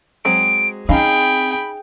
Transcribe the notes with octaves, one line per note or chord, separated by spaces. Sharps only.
F#3 G#3 C4 D7
C4 C#4 D#4 G#4 F5 G5 B5